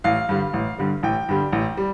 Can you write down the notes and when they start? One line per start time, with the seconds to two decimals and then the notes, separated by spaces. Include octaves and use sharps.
0.04 A1 F5
0.29 G2 D3 G3
0.53 A1
0.78 G2 D3 G3
1.03 A1 G5
1.29 G2 D3 G3
1.52 A1
1.77 G3